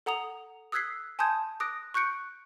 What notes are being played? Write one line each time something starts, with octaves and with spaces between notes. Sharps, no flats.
A4 F#5 A#5 D#6 F7
D#6 E6 F#6 G#6 B6 C7
G#5 A5 C6 D#6 G6 G#6
D6 D#6 F#6 A#6 D7
C#6 F#6 G6 C#7 D7